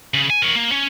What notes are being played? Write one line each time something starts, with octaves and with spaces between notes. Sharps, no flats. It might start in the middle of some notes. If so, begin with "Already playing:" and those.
C#3
G#5
A#4 C#5
A#3
C#4